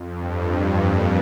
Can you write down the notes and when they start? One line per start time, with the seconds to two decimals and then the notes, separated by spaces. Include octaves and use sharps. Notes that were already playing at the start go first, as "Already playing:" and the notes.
Already playing: F2
0.19 G2
0.78 A#2